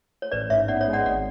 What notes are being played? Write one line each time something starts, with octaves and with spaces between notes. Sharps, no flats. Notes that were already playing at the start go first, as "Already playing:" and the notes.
C#5
A1 B4 D5
G#2 C#5 E5
B3 D5 F#5
C#5 E5
G#3
D5 F#5
G#1 D5 F#5